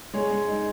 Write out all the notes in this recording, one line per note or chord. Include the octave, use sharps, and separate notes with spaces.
G#3 G#4 C#5
G#3
D#4